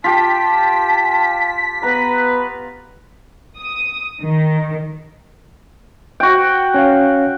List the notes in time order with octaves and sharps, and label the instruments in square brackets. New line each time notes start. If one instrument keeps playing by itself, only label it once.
[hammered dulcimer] F4 G4 [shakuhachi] A5 [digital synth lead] B6
[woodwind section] B3 B4 [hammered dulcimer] A#5
[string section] D#6
D#3
[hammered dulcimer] F#4 G5
[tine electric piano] C#4 C#5 F5